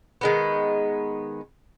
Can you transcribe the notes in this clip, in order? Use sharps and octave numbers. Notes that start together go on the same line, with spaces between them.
D#3 G#3 B3